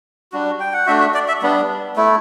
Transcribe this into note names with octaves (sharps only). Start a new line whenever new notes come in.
G3 D4 F#4
G5
F#5
A3 D4 F#4 E5
E5
D5
E5
G3 B3 D4
A3 E4